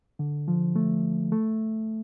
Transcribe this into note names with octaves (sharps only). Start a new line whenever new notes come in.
D3
F3
A3
A3